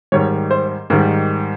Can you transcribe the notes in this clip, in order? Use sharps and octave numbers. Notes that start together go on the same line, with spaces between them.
G#2 D#3 G3 C#5
C5
G#2 D#3 G3 A#4